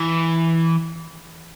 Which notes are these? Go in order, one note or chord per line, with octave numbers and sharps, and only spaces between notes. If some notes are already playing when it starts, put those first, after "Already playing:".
Already playing: E3